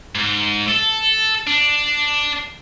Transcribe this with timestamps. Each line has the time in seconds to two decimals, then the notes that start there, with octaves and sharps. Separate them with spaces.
0.15 G#2
0.68 A4
1.47 D4